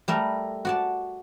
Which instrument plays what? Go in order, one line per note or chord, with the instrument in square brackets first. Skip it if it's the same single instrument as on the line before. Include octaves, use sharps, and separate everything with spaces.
[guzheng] G3 A3 A#4
F#4 D5 A5